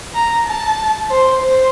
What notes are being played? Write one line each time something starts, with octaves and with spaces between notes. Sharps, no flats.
A#5
A5
C5
C5